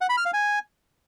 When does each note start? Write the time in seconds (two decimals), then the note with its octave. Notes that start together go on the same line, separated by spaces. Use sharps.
0.01 F#5
0.09 B5
0.17 F6
0.25 F5
0.33 G#5